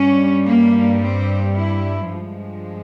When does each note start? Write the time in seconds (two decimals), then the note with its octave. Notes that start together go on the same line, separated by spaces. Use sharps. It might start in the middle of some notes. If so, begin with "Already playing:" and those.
Already playing: G2 G3 C#4
0.45 A#3
1.00 C4
1.55 E4
2.09 G2 F3 G#3